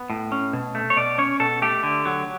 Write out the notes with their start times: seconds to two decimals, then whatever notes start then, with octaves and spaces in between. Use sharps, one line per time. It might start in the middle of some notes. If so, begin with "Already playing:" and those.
Already playing: B3
0.10 A2
0.32 C#4
0.53 B2
0.75 A3
0.90 C#5
0.97 B2 D5
1.18 C#4 C#5
1.40 B2 A4
1.62 A3 G4
1.83 D3
2.05 F#3